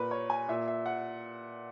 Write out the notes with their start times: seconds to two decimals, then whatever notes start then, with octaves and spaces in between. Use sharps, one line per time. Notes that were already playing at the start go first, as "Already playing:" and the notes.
Already playing: A#2 A#4 B4
0.11 C#5
0.30 G#5
0.48 A#2 E5
0.68 E5
0.86 F#5